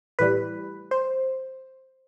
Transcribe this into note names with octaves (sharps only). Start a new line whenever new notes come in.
A2 E3 G3 B4
C5